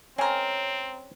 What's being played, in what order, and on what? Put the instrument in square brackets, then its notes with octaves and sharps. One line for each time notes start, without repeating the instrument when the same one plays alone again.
[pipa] G#3 A#4 [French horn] C4 [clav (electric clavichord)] C#4 G5